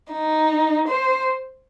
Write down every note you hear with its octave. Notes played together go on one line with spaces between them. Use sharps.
D#4
C5